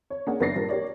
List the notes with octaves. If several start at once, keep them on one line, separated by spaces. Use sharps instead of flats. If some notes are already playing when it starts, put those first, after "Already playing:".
C#5
A#3 C#4 D4 G#4 A#4 F#5
F#1 B3 D4 A6 A#6 C7
G2 A#2 A#4
G4 A#4 C#5 D5